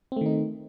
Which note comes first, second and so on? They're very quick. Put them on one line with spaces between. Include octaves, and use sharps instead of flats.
C4 A3 D#3 D#4